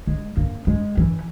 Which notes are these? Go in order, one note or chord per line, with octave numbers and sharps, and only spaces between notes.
G#3
A#3
G#3
E3